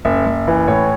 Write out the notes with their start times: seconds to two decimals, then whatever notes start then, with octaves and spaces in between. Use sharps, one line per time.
0.05 F#1 E5
0.26 F#1
0.47 E3
0.68 A2 C#5